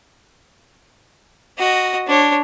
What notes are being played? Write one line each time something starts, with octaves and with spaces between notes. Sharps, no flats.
F#4 D#5
D4 C#5